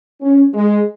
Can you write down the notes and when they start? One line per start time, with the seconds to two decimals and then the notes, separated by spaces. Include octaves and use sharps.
0.21 C#4
0.54 G#3